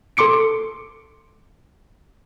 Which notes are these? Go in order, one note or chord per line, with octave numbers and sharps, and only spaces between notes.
A4 C6 D6 C#7 D7